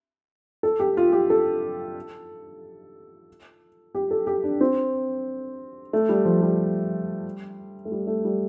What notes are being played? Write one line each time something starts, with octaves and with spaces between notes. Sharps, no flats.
A4
G4
F4
G4
A4
G4
A4
G4
D4
C4
A3
G3
F3
G3
A3
G3
A3
G3